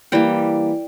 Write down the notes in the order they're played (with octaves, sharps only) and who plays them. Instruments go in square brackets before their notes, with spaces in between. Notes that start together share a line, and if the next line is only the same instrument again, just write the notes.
[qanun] E3 G3 A#3 G5